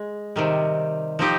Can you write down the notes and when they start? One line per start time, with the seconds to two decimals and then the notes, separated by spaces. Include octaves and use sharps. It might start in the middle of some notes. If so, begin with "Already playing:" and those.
Already playing: G#3
0.36 C3 D#3 G3
1.19 F3 C4 D#4 G4